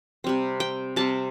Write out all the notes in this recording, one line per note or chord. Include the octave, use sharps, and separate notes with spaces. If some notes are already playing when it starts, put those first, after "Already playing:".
C3 G3 C4
G5
C3 G3 C4 A5